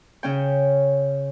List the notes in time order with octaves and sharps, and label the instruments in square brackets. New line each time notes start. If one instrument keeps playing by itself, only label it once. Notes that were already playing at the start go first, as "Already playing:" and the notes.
[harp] C#3 C#4 G5